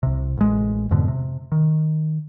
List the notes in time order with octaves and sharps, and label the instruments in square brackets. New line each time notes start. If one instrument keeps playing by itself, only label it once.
[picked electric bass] C2 C3
A1 G#3
F2 G#2 B2 D3
C3
D#3